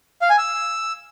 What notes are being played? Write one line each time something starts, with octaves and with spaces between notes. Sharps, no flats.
F5
G#5
E6